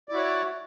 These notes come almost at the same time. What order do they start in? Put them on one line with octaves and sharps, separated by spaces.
D5 E4 F#4 C#5